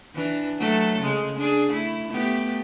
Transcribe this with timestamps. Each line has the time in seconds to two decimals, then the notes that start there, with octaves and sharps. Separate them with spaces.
0.15 E3 D4
0.58 F#3 A3 A4
1.01 C#3 G#3
1.38 D4 G#4
1.71 A3 E4
2.10 A3 B3 G4